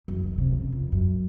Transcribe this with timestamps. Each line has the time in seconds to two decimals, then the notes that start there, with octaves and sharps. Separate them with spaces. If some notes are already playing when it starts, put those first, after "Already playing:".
0.08 F#2
0.23 D#3
0.38 C3
0.52 C#3
0.72 F2
0.92 F#2